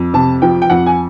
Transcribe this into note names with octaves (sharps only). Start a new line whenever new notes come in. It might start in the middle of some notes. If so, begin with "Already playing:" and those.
Already playing: F2
C3 A5
F3 G5
G5
F2 F#5
G#5